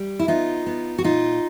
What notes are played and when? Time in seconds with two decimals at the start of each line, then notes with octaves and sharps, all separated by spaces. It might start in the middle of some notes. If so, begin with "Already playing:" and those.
Already playing: G3
0.19 E4
0.28 B3 D#4 F4
0.66 B3
0.98 F#4
1.04 A#2 D#4 F4